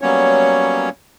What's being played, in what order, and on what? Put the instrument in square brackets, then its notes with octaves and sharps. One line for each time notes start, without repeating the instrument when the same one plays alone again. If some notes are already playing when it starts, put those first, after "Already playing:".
[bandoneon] F#3 G3 A#3 B3 C#4 C#5